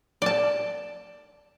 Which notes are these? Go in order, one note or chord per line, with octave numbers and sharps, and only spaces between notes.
D5 A5